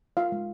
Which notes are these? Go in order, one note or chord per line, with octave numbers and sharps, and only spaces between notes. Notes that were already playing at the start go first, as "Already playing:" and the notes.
F4 F5
G#3